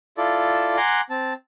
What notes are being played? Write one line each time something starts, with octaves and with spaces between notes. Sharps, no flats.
E4 F4 A4 D5
F#5 G#5 A#5 C6 D6 F#6
C4 A5